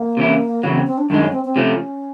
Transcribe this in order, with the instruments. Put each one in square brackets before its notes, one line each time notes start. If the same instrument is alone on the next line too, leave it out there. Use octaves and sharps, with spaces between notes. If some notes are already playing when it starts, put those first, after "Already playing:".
Already playing: [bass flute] A#3
[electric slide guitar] C3 E3 A3 C#4 E4
[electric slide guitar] E2 C#3 F#3 [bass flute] B3
[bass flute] C4
C4
D4
[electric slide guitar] F#2 D#3 G#3 [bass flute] D4
[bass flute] C#4
C4
C4
[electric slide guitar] C3 F3 A3 [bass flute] C#4